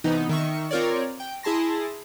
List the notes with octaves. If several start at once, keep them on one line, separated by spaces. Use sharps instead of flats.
C3 E3 B3 D#4
D#3 E5 C#6
C4 F4 A#4 C#5 D5
G5
E4 G#4 A5 C6 A#6